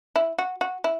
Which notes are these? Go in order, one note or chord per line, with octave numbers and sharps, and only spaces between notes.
E4
F#4
F#4
E4